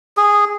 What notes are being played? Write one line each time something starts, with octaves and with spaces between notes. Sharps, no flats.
G#4